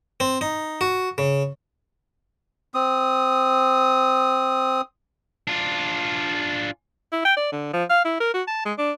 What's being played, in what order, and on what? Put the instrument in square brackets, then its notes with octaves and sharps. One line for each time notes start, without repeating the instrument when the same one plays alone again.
[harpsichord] C4
D#4
F#4
C#3
[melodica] C4 D#6
[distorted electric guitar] D4 F4
[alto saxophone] E4
G5
D5
D3
F3
F5
E4
A#4
F#4
A5
G#3
D4